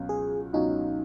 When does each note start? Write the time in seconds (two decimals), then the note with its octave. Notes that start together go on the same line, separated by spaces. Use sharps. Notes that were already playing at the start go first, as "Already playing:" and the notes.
Already playing: C#2 B2 F#3 C#4
0.09 G#4
0.53 C#2 B2 F#3 C#4 D#4